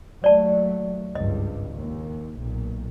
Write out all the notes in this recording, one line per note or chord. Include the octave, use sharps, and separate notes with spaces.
D#2 F#3 A3 D5 A5
G#1 C#2 G2 D#5
D#2
B1 A#2